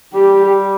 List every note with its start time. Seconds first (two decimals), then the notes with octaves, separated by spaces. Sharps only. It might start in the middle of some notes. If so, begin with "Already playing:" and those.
0.14 G3 G4